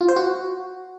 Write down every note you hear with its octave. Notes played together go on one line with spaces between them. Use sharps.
F4
C5
F#4